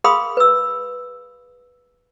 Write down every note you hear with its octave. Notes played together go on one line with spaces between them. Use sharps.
G#4 A#4 F5 B5 C6 D#6
B4 E6